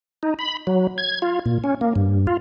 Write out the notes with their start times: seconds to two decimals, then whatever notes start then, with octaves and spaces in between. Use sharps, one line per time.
0.23 D#4
0.39 B5
0.67 F#3
0.98 G#6
1.22 F4
1.46 A#2
1.64 C#4
1.81 A#3
1.96 G2
2.27 F4